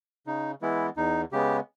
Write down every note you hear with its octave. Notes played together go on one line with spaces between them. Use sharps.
C#3 D#4
E3 G#3 B3 E4
E2 D#4
C#3 G#3 B3 G4